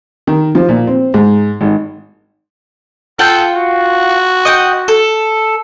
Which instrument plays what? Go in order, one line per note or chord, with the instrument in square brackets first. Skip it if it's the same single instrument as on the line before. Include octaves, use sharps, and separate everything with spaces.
[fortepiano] D#3
F3
A#2
C4
G#2
G#1
[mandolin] F4 F#5 G5 [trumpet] A4
[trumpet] F#4
[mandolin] D#5 F#5 G5
A4